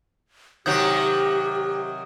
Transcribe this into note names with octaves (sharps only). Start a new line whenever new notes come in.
C3 D#3 F#3 G4 D#6 G6 G#6